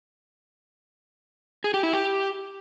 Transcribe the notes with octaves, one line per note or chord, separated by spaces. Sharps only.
G#4
G4
E4
G4